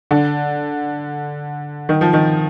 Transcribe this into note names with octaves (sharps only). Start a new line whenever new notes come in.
D3
D#3
F3
D#3